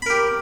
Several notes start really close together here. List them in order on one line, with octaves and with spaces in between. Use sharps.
B5 A#4 G4